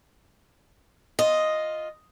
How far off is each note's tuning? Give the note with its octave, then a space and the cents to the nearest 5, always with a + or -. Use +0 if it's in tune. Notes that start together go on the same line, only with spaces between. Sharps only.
F4 +0 D#5 +0